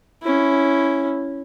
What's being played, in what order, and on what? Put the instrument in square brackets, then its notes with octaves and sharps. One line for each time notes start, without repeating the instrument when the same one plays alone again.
[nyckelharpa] C#4 E4